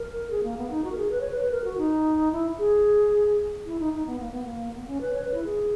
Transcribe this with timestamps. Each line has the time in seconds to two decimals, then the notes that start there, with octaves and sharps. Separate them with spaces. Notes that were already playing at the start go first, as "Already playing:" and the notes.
Already playing: A#4
0.30 G#4
0.44 A#3
0.58 B3
0.70 D#4
0.84 F#4
0.92 A#4
0.98 G#4
1.11 B4
1.21 C#5
1.31 B4
1.41 B4
1.51 A#4
1.64 F#4
1.78 D#4
2.32 E4
2.59 G#4
3.66 E4
3.79 D#4
3.93 D#4
4.06 B3
4.20 A#3
4.32 B3
4.44 A#3
4.74 B3
4.87 C#4
5.01 B4
5.14 C#5
5.24 B4
5.34 E4
5.44 G#4